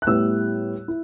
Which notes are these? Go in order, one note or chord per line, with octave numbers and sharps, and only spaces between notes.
F#6
A2 G3 B3 E4 E6
E4